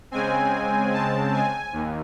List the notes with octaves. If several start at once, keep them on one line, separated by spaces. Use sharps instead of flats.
C#3 G#3 C4 G#5
A5
G#5
D#2